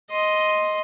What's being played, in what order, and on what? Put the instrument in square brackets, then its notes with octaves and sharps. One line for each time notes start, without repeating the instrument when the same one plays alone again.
[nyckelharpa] D#5 C6